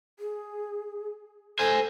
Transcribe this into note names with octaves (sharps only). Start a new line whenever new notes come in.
G#4
A4 C5 G#5